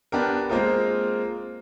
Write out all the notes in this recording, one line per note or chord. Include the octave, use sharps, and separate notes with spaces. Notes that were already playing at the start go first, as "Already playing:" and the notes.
B3 D4 G4 A#4
G#3 A#3 C4 F4 G#4 A#4